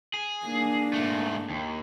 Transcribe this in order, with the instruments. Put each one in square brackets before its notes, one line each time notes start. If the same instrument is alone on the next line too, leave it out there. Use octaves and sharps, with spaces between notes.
[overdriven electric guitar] G#4
[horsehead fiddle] A#3 D4
[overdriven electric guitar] G#2 A3
D#2